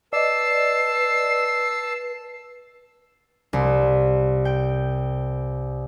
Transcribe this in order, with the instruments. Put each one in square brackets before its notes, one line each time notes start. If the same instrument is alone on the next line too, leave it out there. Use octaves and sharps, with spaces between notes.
[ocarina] B4 [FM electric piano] D5 D#5 [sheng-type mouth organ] A5 E6 [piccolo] C7
[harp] C2
G5